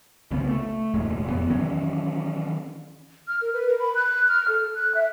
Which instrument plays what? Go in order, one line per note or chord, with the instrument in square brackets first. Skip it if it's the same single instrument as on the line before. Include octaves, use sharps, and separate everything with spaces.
[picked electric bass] C2 C#3 B3
A3
F1 D#2 A#2 G#3
F2 B3
D#3 E3 F#3 C#4
[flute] F6
A#4
B4
A#4
B5
F#6
F6
A4
F#6
E5